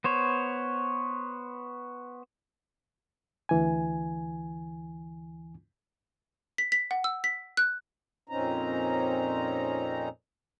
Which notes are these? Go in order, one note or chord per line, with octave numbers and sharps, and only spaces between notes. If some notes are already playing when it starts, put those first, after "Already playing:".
B3 C5 C#5
D2 E3 G#5
B6
B6
F#5
E6
B6
F#6
F2 A#2 C4 C#4 D#4 A#5